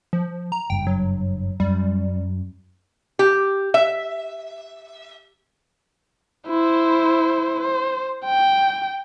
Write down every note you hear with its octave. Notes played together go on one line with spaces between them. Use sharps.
F3
A#5
F#1 G2 G5
F#3
F#2 G3
G4
E5
E4 C5
C5
G5